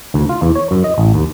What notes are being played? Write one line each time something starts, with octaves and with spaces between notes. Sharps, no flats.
D2
F4
E2
C#5
F#2
D#5
A1
D#2